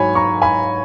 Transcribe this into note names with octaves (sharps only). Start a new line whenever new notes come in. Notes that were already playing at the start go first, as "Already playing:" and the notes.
Already playing: G#2 F#3 C#5 G#5 B5
A#5 C#6
G#5 B5